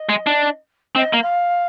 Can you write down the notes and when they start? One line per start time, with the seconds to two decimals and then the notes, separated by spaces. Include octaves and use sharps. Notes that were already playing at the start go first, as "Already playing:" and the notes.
Already playing: D#5
0.09 G#3
0.27 D4
0.96 C4 D#5
1.13 A#3
1.22 F5